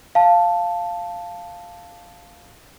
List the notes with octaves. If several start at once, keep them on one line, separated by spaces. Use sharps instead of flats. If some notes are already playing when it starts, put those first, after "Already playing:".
F5 A5